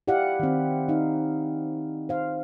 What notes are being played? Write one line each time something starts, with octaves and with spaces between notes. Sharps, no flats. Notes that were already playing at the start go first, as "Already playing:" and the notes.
E4 G4 D5 F5 F#5
D#3 C4
D#4 F5
C5 F5